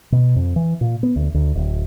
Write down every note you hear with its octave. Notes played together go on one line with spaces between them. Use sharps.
B2
F2
E3
A#2
B3
D2
D2
D1